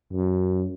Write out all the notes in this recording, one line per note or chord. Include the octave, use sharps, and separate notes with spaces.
F#2